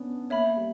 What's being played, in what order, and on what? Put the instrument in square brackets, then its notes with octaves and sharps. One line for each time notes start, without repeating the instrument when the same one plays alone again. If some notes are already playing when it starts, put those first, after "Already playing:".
Already playing: [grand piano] B3 C#4 D4
[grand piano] A#3 [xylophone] C#5 E5 B5
[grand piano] G3